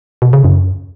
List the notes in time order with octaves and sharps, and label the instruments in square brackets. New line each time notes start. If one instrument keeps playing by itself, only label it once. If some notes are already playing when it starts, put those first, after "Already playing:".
[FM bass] B2
C#3
F#2